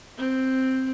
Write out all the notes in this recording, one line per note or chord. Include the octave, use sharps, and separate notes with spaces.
C4